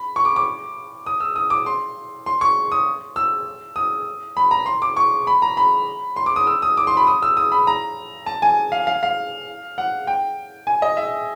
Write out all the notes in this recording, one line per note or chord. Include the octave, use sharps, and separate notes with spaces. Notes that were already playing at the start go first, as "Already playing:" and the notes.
Already playing: B5
C#6
D6
D6
D#6
E6
D#6
D6
C6
C6
C#6
D#6
E6
D#6
B5
A#5
C6
D6
C#6
B5
A#5
B5
C6
D6
D#6
E6
D#6
D6
C6
B5
D#6
E6
D#6
B5
A#5
A5
G#5
F5
F5
F5
F#5
G5
G#5
D#5
E5